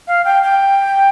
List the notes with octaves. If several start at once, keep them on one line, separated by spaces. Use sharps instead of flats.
F5
G5
G5